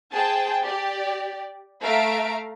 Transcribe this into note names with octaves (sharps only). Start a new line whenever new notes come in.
G#4 C5 G5 A5
G4 D5
A3 E5 F5 A#5 D7